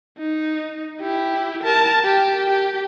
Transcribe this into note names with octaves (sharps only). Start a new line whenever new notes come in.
D#4
E4 G4
A#4 A5
G4
G4